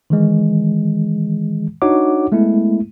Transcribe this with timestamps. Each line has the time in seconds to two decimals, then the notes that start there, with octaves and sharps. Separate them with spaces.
0.10 D#3 E3 G#3
1.82 D4 D#4 F#4 C#5 F#5 D6
2.32 G#3 A3 B3 E4